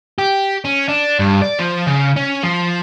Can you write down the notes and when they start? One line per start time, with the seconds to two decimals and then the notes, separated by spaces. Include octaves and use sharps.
0.18 G4
0.65 C#4
0.89 D4
1.19 G2
1.42 D5
1.59 F3
1.87 C#3
2.16 C#4
2.43 F3